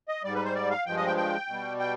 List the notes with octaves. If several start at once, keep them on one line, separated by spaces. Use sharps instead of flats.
D#5
G#2 G3 D5
B4
C5
D5
F5
G2 F3 G#3 G5
D#5
G5
G5
B2 G3
G5